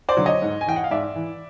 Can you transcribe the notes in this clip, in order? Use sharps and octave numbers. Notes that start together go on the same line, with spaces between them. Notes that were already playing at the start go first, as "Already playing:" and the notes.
C5 D5
D3 F#3
C#5 D#5
G#2
G#5
E3 G5
F#5
F5
G#2 D5 E5
E3